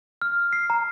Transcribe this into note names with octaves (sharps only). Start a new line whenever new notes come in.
F6
C7
A#5